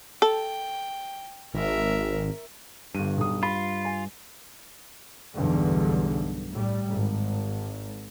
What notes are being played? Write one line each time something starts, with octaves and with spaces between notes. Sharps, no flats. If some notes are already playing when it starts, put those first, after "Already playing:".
A4 G5
G#1 A#4 E5
G1 G2 D#7
B1 D#6
F4 B5
G#5
B1 E2 G2 D3
A2 G3
G#1